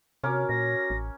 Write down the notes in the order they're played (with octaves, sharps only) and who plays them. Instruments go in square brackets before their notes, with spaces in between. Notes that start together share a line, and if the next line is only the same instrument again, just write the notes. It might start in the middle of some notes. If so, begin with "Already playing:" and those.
[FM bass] C3 [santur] C#4 A#4 D6 [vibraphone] F#4 C#5
[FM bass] A#2 [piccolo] A#6
[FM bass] A1